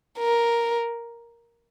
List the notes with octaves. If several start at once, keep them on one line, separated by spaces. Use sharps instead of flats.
A#4